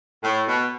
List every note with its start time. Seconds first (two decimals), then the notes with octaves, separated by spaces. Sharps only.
0.23 A2
0.48 B2